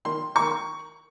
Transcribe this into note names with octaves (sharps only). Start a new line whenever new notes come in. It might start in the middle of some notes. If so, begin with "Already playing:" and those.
D#3 A#3 C6
D#3 A#3 C#6